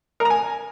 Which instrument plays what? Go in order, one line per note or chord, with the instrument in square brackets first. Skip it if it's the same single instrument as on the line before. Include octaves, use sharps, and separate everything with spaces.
[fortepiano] A#4
A#5
G#5